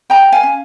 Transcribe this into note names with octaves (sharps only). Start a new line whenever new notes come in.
G#4 G5 A#5
F5 G#5
C#4